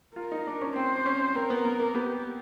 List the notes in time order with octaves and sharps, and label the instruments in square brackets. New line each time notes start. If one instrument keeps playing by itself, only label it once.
[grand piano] F4 [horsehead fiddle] A#4
[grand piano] D#4
D4
C#4
[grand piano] C4 [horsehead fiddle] C5
[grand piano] C#4
[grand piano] C4 [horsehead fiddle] A#4
[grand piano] B3
B3
A#3
[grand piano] B3 [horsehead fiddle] G4